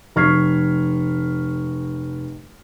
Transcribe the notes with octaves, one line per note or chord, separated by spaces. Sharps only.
F1 C#6 F6 G#6 B6 C7